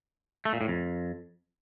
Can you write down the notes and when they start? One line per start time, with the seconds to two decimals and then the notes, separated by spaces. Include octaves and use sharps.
0.45 A3
0.53 A#2
0.61 A2
0.68 F2